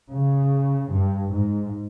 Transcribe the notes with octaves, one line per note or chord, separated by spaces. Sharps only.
C#3
G2
G#2